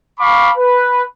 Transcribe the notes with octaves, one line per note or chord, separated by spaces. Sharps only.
F5 A5 B5 C#6 D6
B4